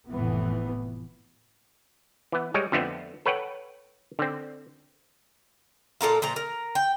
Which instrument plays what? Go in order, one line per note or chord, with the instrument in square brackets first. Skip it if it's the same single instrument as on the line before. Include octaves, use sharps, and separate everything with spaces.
[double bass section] F1 A2 E3 B3
[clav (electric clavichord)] E3 B3
G3 G#3 C#5
F2 D3 A3 B3 C4
A4 B4 C#5 F#5 G5
D3 C4
[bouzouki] A#2 A4 A#4 F5
A#2 F3 A#5
A#4
G5